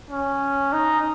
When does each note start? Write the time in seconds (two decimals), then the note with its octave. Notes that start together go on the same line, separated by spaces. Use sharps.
0.10 C#4
0.73 D#4